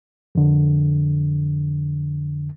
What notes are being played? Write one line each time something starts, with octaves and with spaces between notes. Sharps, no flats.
F2 D3